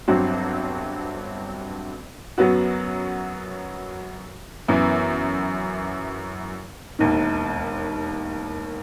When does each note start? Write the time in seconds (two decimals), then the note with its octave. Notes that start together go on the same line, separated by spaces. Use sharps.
0.08 G1 G2 F#3 C4 F#4
2.38 F#2 F#3 B3 F#4
4.68 F#2 E3 B3 E4
6.99 E1 D#2 D#3